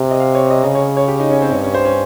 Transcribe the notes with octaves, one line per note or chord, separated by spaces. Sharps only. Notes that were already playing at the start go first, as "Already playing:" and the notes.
Already playing: C3
D#5
F5
C#5
D#5
C#3 D#5
C#5
C#5
G4
D#4
C#4
C4
G2 C#4
C#4
C5
C#4